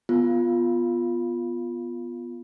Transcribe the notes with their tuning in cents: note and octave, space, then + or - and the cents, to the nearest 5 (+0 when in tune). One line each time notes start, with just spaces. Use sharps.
B3 +0 F4 +0